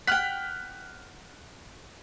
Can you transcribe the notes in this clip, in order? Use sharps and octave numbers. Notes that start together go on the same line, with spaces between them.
F#5 G5 F6 F#6 B6